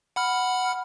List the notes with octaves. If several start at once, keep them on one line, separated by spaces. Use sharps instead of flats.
F#5 B5 F6